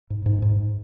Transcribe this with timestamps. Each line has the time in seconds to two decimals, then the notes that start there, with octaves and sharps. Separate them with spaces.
0.10 G#2
0.26 G#2
0.42 G#2